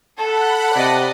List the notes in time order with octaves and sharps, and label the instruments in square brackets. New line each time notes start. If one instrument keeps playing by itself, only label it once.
[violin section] A4 [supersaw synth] F#5 B5 F#6 [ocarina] A5
[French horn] C3 [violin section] D5 D#5